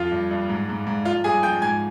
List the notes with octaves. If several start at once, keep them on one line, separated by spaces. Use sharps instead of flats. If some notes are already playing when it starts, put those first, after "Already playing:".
Already playing: F2 F3 F4 F5
G2
G2
G#2
G#2
G#2
F3 F4 F5
G2 G#4 G#5
F3 G5 G6
G#2 G#5 G#6